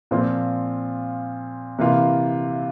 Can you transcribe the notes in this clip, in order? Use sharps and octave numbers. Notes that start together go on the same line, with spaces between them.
A#2 F3 C4 F4
C3 E3 A#3 F4